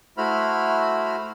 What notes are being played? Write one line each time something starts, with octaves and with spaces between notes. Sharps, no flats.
A3 E4 F#4 C5 B5 F6